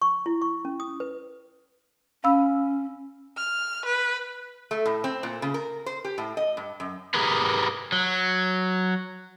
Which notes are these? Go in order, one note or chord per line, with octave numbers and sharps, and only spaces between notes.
C#6
E4
C#6
C#4
D#6
B4
C#4 F5 B5 E6
F6
B4
A3
A2
C4
A#2
C#3
A#4
C5
G4
A2
D#5
G2
F#2
G4 G#4 A#4 B4
F#3